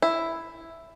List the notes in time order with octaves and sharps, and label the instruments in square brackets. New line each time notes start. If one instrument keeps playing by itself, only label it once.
[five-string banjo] E4